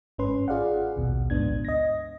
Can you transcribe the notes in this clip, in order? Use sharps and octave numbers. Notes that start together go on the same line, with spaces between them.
G1 G#2 C#4 B4 C6
F4 G#4 D5 F5 F#5
A#1 D#2 B2
A1 D2 G#2 B3 D4 G#6
D#5 A#6